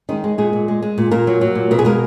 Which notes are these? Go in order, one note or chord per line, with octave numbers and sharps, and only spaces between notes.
D#3 G#3 D#4
G#3
A#2 G#3 G#4
A#2
G#3
G#3
A#2
A#2 A#3 A#4
F#3
F#3
A#2
B2 A#4
G#4
G#3 A#3 A#4